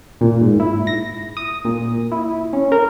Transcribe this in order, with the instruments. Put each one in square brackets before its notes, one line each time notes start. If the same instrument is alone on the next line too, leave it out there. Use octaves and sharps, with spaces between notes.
[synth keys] A#2
G#2
E4
A#6
D#6
A#2
E4
C#4
A#4